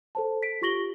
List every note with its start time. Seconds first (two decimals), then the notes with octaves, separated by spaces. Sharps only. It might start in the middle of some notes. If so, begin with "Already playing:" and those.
0.15 A4 C5 A5
0.43 B6 D7
0.62 F4 G4 C#6 A#6 F#7 G7